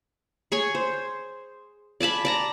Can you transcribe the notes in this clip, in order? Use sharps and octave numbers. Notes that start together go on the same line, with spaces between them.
G#4 C#5 G#5
C5
D5 G#5 A5 B5
D5 A5 A#5